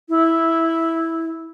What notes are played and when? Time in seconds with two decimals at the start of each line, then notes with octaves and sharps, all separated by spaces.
0.09 E4